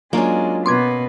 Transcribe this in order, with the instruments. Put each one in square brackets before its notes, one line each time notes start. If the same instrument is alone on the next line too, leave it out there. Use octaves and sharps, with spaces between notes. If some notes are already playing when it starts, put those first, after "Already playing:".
[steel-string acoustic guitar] F#3 D4 F4 [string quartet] G#3 [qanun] A#3 C#4
[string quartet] B2 B3 [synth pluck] C6 D6 G#6